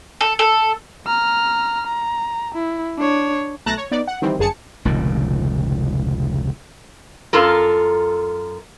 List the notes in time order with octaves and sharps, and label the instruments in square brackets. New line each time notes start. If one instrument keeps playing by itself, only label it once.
[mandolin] A4
A4
[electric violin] A#5 F6
A#5
E4
D4 C#5
[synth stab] B1 A3 A5 A#5 F#6 A#6
C#5
B3 D#4 D5
F#5
D#3 E3 G3 C4
G1 F#2 G#4 A5 C#7
[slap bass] F1 C#2 A#2 D#3
[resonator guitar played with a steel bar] F#2 F4 A4 A#4